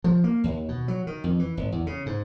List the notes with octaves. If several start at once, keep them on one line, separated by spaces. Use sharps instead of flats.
F3
A#3
D#2
B2
F#3
D#3
F2
E3
G#1
E2
C#3
G#2